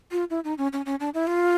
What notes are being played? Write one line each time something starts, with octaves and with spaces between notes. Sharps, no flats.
F4
E4
D#4
C#4
C#4
C#4
D4
E4
F4